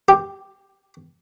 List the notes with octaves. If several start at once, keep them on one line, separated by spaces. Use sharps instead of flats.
G4